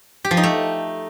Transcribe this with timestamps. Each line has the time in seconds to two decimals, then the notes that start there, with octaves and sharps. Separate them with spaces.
0.24 G4
0.31 F3
0.37 D#4
0.43 A3